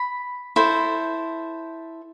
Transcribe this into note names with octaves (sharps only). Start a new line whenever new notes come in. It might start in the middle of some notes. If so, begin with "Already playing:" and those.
Already playing: B5
E4 A4 C5